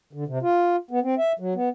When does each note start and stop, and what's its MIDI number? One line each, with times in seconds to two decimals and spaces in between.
0.13 0.24 50
0.27 0.39 48
0.42 0.76 65
0.91 0.99 59
1.03 1.15 60
1.18 1.32 76
1.39 1.54 54
1.55 1.69 59